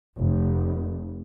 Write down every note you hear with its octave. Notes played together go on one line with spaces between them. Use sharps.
F1